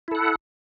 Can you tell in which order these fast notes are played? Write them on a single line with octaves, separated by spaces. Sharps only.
E4 A4 F#5